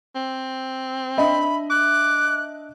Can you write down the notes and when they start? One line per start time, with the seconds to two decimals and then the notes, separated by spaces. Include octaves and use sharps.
0.15 C4
1.18 D4 D#5 E5 B5
1.70 D6 F#6